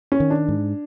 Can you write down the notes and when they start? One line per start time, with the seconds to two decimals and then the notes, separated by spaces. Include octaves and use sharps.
0.12 C#4
0.20 D#3
0.30 D4
0.48 G#2